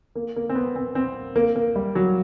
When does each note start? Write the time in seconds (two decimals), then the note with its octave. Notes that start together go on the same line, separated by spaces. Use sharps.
0.15 A#3
0.36 A#3
0.49 C4
0.55 B3
0.76 C4
0.95 C4
1.36 A#3
1.56 A#3
1.76 G3
1.95 F#3